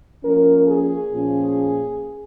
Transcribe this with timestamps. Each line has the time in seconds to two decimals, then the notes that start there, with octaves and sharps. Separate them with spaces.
0.24 F3 A#3 C#4 A#4
0.67 G#4
1.11 A#2 F3 A#3 C#4